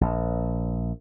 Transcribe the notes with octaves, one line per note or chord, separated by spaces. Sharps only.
A#1